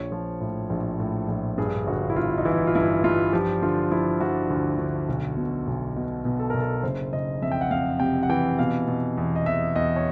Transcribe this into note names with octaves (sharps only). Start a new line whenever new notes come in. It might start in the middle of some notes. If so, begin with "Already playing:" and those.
Already playing: A#1 C#5
F3
A2
A#1
A2
A#1
G2 G#4
G1 F#4
E4
G1 F4
D#4
E3 E4
F4
G2 E4
G2 F4
F3 G4
D3 F4
F3 E4
F3 F#4
D2
D2
B1
B2
B1
B2
B2
A4
B1 A#4
A4
F#1 C5
F#1 D#5
F2 E5
G5
F#5
F2 F5
C3 G5
F#5
E3 G5
B2 F5
B2
E2
D#5
E2 E5
E2 D#5
C#5